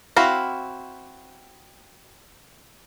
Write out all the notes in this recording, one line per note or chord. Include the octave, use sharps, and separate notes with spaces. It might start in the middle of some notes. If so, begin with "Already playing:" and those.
C4 E4 F#4 F5